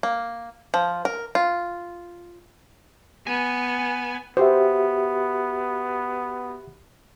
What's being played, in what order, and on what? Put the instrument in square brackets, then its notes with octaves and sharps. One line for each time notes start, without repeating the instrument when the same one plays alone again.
[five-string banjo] A#3
F3
A#4
F4
[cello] B3 [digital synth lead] G#5
[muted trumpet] B3 [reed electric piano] F#4 G4 E5 [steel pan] C5